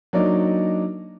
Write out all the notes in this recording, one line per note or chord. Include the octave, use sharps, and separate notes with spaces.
F#3 A#3 D4 D#4 D5 D#5